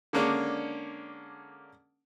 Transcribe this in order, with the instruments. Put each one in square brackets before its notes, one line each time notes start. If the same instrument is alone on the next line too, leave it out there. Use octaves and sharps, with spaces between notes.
[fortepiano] D3 G#3 A#3 C#4 D4